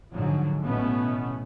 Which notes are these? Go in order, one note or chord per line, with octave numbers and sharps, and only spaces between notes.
G#2 D3 F3 F#3
A1 B2 A3 B3 C#4